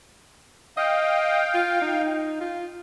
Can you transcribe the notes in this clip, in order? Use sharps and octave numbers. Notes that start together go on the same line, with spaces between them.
D#5 F5 G5
F4
D#4
F4